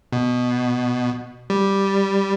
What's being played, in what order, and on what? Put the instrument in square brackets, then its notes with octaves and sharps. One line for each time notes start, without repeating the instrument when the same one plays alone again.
[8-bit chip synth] B2
G3